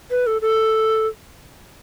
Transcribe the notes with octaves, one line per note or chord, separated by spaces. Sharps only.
B4
A4
A4